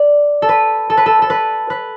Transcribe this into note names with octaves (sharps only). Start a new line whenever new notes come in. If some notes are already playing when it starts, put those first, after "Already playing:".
Already playing: D5
A4
B4
A4
B4
A4
A4
B4
B4